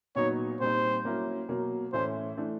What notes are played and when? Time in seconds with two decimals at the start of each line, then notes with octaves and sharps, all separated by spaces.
0.16 A#2 F#3 B3 D#4 C#5
0.60 A#2 G3 C4 D#4 C5
1.04 F#3 A#3 C#4 E4
1.49 B2 F#3 A#3
1.93 A2 E3 A3 C#4 E4 C5
2.37 E3 A3 D4